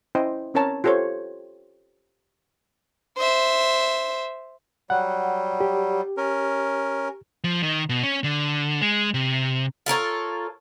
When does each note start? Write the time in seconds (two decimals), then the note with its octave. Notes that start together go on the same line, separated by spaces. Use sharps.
0.15 C#4 E4 C5 D#5 G5
0.54 C4 C#4 A#4 C#5 A5 A#5
0.84 F4 G4 A4 C5 C#5
3.18 C5 E5
4.90 F#3 G3 F#5
5.60 G4
6.17 C#4 A#4
7.44 F3
7.63 D#3
7.89 B2
8.03 C#4
8.24 D3
8.82 G#3
9.14 C3
9.86 F4 A4 A#4 C#5